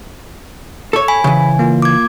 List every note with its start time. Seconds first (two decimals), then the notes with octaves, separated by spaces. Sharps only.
0.93 A4 C#5
1.08 G#5 B5
1.24 C#3 E3
1.59 A#3 F4
1.82 D6 G#6